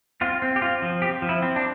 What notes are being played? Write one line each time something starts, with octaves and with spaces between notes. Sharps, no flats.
C4 F4
C4
G4
C4 F4
F3
C4 G4
F3
E4
C4
D4